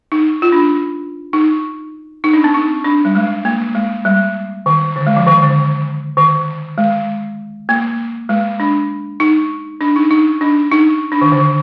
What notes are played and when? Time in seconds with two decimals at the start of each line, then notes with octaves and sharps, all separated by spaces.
0.12 D#4
0.42 F4
0.52 D4
1.33 D#4
2.24 D#4
2.34 D4
2.44 C4
2.54 D#4
2.84 D4
3.05 G3
3.15 G#3
3.45 A#3
3.75 G#3
4.05 G3
4.66 D#3
4.96 D3
5.07 G#3
5.17 F3
5.26 D#3
5.42 D3
6.17 D#3
6.78 G#3
7.69 A#3
8.29 G#3
8.60 D4
9.20 D#4
9.81 D4
9.96 D#4
10.11 D#4
10.41 D4
10.71 D#4
11.12 D4
11.21 D#3
11.32 D3